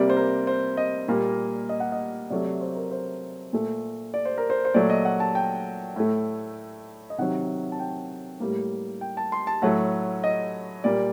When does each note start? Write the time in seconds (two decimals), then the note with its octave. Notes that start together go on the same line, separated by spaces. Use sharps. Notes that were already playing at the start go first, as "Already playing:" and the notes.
Already playing: C3 G3 A#3 D5
0.10 C5
0.17 A#4
0.47 C5
0.77 D#5
1.08 A#2 G3 A#3
1.69 D#5
1.80 F#5
1.92 D#5
2.30 C3 F#3 A3 D5
2.46 D5
2.61 C5
2.76 A#4
2.91 C5
3.53 A#2 A3
4.14 D5
4.25 C5
4.38 A#4
4.50 C5
4.65 C5
4.74 A#2 F#3 A3 D5
4.90 D#5
5.05 F#5
5.20 A5
5.35 G5
5.96 A2 A3
7.10 D#5
7.18 C3 D#3 F#3 F#5
7.72 A5
7.80 G5
8.40 A2 G3 A#3
9.01 G5
9.17 A5
9.32 C6
9.47 A5
9.62 A2 F#3 A3 F#5
10.24 D#5
10.84 A#2 G3 A#3 D5